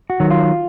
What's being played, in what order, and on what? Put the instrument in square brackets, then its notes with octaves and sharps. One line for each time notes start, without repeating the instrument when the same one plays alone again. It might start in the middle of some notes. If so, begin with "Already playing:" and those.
[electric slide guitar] F#4
D#3 F#3
F4